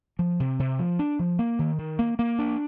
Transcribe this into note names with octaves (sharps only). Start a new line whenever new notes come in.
F3
C3
C3
F3
D4
F3
A#3
D#3
D#3
A#3
A#3
D4